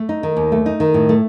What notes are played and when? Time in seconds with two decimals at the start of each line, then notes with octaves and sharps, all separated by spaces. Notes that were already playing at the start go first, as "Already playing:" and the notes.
Already playing: A3
0.09 D#4
0.23 D#3
0.37 D#2
0.52 A3
0.66 D#4
0.80 D#3
0.94 A2
1.09 A3